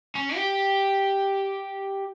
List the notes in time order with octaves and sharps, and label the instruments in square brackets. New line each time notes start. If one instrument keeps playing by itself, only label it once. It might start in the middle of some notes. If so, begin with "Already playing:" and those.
[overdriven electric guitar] C#4
G4